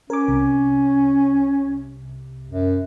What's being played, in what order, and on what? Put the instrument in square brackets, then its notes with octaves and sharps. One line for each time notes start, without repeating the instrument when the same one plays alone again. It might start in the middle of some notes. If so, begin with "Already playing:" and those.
[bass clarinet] C#4 [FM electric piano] A#4 D6
[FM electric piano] C2 C3
[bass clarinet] F#2